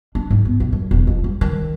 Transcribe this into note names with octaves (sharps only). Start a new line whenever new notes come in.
D4
G#2
B3
B1
F#2
E1
F2
G3
D#3